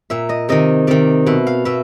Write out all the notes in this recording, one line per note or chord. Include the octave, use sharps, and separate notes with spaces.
A#2 E5
D#5
C3 D#3 D#5
C3 D#3 D5
B2 E5
F5
B2 E5